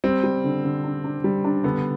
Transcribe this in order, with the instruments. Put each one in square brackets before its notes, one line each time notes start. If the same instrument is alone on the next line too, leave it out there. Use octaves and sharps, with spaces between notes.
[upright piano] G3 [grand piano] C4
[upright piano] G3
D3
D3
D4
D4
G3
D4
[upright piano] D3 [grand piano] B3